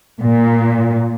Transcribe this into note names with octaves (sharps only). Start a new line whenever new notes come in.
A#2